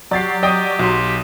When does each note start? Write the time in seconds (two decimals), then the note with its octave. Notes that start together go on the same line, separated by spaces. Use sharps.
0.11 F#3 G4 D5 A6 C7
0.43 D5 D#5 G5 D#6
0.79 B1 F#4 C6